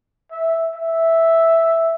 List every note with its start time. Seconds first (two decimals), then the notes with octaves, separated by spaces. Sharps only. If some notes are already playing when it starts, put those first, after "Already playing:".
0.31 E5
0.75 E5